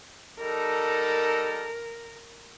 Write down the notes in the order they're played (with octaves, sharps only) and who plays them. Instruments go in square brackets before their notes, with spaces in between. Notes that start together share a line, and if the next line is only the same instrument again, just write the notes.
[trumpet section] G3 D#4 A4 [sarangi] A#4